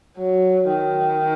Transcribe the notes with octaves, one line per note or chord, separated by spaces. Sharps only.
F#3
D#3